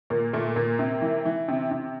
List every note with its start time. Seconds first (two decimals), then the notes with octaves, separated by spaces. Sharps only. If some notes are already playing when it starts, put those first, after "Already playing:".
0.10 A#2 A#3
0.33 A#2 A3
0.56 A#2 A#3
0.79 C3
1.01 E3
1.25 E3
1.48 C3
1.71 C3